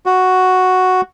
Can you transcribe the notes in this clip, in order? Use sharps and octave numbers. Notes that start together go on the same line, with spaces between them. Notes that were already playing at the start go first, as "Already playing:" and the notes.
F#4